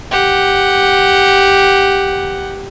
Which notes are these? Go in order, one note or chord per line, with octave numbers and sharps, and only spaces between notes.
G4 F#5